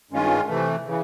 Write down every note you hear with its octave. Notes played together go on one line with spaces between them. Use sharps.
G2 D#3 G#3 C#4 F4
C3 E3 A3
C#3 E3